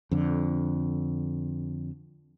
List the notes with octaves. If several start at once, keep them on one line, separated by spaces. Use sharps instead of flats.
F2 D3